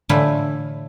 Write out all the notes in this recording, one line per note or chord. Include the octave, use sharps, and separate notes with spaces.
A2 D3 E3 A3 E4 F4